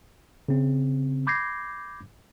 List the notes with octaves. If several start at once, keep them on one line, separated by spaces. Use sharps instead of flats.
C#3 C4
B5 D6 G6 G#6 A#6 C7